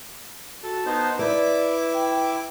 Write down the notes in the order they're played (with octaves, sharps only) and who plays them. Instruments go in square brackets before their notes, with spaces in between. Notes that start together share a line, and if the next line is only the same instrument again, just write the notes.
[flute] F#4 [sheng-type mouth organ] A4
[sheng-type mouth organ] B3 D#4 C5 [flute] A5
[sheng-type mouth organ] E4 D6 [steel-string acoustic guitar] B4 [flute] D5
[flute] G5